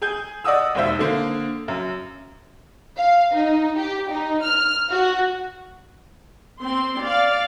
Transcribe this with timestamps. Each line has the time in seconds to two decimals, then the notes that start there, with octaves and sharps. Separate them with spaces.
0.02 G#4 G#5 G6
0.44 D5 D#5 F#5 D#6 E6
0.75 E1 D#2 C5 E5
0.99 D3 A#3 C5
1.68 F#2
2.97 F5
3.35 D#4
3.78 G4
4.10 D#4
4.43 F6
4.92 F#4
6.62 C4 C6
7.02 D5 F5